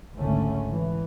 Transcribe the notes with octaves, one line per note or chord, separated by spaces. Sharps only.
G#1 C#2 D3 A3 C#4
E3